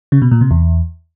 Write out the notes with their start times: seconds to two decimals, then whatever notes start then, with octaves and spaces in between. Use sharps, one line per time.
0.12 C#3
0.22 B2
0.31 A#2
0.41 C3
0.51 E2